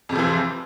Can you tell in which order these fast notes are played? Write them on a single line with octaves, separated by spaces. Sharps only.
F2 C3 F3 E3